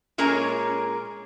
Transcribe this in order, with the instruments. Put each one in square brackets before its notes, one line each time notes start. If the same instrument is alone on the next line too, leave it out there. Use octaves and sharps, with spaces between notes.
[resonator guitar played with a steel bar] A#2 G#3 C#4 A#4 C#5 A#5